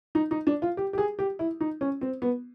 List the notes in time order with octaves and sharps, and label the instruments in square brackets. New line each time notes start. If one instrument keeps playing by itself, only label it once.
[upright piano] D#4
D#4
D4
F4
G4
G4
G#4
G4
E4
D#4
C#4
C4
B3